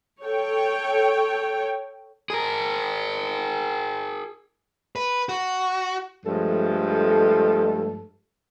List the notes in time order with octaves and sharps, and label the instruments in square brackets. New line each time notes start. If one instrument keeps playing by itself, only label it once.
[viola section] A4 C#5 G5
[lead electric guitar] G#4 A#4
B4
F#4
[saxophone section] G2 F3 G#3 A3 A4